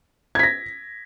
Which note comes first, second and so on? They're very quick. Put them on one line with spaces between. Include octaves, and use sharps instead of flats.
G#6 B6 A#6